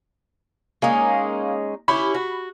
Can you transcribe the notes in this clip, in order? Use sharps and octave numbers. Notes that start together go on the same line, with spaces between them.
G#3 A#3 C#4 D#4
C#4 E4 G4 B5
F#4